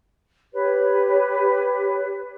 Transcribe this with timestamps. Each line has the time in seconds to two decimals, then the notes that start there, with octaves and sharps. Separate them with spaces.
0.53 G4 B4 C#5